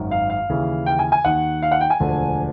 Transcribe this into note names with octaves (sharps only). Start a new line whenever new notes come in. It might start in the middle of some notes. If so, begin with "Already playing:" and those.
Already playing: G#1 F#2 D#3
F5
F5
D#2 C#3 E3
G5
G#5
G#5
D#2 D#3 F#5
F5
F#5
G5
G#5
E1 D2 D3 F3